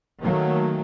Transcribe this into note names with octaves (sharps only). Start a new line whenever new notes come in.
D#3 F#3 A3 A#3